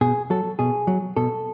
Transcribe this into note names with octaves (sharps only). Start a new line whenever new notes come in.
B2 G#4
F#3 A4
B2 G#4
F#3
B2 A4